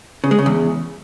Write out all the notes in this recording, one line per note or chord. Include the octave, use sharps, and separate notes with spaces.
C#3
G#3
C#3
E2